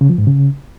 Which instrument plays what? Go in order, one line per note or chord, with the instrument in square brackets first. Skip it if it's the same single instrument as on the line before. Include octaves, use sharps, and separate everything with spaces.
[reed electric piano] C#3
F3
G#2
C#3